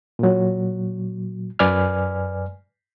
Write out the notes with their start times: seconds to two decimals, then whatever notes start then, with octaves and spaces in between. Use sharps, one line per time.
0.19 A#2 F#3
1.59 F#2 B4 D5 G#5 F6